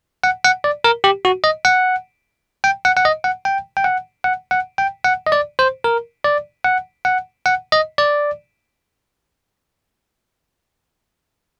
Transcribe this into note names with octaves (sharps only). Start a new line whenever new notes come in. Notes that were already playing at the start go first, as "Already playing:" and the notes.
F#5
F#5
D5
A#4
G4
F#4
D#5
F#5
G5
F#5
F#5
D#5
F#5
G5
G5
F#5
F#5
F#5
G5
F#5
D#5
D5
C5
A#4
D5
F#5
F#5
F#5
D#5
D5